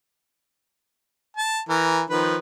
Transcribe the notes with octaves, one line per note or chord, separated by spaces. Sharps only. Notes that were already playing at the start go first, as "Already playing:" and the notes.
A5
E3 A#4
D#3 F3 B4